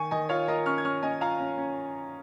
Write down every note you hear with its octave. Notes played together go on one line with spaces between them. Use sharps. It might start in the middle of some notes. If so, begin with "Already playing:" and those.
Already playing: D#3 G#5 C#6
D#3 D#5 G#5
F4 C#5 F5
F4 A#4 D#5
C#4 C#6 F6
G#6
C#4 C#6 F6
C#4 D#5 G#5
F4 F5 A#5
C#4
C#4